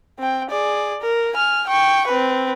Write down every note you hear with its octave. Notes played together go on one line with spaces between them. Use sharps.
C4 G5
G#4 D5
A#4
G#5 F6
G5 C#6
C4 B4